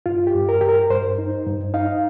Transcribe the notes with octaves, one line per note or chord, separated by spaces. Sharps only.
G2 F4
G4
G2
A#4
G2 G4
A#4
G2 C5
D#4
G2
D#4 F5